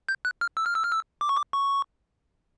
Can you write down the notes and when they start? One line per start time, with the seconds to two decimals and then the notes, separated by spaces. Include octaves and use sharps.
0.09 G6
0.25 F#6
0.41 F6
0.57 E6
0.66 F6
0.75 E6
0.84 F6
0.92 E6
1.21 D6
1.29 C#6
1.37 D6
1.53 C#6